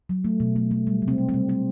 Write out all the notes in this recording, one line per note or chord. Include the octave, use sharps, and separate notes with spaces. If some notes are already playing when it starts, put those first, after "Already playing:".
F#3
A3
B2
A3
A3
G3
C3
C4
G3
C4
G3
G3 C4